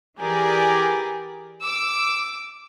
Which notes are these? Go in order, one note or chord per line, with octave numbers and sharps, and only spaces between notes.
E3 G4 G#4 A#4 D5
D6 E6